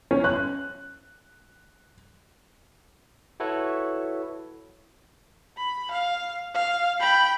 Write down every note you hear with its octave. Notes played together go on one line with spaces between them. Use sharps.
C#4
F#6
E4 F#4 A4 B4 C#5
B5
F5
F5
G5 B5